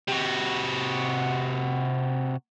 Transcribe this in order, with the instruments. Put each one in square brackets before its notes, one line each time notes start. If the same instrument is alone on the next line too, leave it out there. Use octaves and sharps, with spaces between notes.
[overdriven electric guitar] C3 F#4